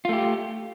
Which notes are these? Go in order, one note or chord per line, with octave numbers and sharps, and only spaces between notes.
A3 F4 G4